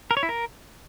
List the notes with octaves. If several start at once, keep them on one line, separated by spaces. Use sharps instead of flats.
A#4
C#5
E4
A#4